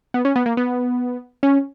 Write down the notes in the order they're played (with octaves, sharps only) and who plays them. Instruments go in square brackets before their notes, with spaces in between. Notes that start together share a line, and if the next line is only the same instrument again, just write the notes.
[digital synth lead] B3
C#4
B3
A#3
B3
C#4